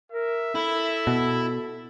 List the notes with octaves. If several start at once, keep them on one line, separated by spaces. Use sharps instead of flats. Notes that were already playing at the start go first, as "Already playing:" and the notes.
A#4 E5
E4 A4
B2